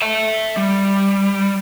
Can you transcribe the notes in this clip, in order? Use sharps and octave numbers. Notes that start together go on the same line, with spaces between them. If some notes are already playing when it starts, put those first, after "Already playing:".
E5 A5
G3